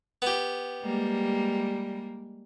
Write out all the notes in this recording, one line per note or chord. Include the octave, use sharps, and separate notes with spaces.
B3 G4
G3 G#3 A#3